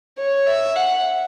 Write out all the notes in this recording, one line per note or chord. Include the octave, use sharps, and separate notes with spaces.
C#5
E5
F#5